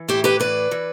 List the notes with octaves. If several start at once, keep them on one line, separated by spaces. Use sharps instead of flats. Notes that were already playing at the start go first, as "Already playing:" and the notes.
Already playing: E3
A2 E4 G4
G4 B4
E3 B4 D5
E3